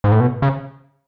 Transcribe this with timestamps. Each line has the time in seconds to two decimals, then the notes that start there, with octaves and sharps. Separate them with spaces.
0.04 G#2
0.12 A2
0.20 B2
0.42 C#3